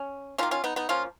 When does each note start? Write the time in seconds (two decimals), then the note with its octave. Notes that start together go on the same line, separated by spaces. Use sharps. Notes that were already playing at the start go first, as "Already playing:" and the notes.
Already playing: C#4
0.38 D#3 C#4 F4
0.43 A#3
0.51 C#4 F4
0.64 B3 D#4
0.76 B3 D#4
0.89 F3 A#3 C#4 F4